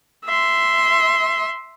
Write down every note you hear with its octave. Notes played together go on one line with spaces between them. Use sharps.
E5 C6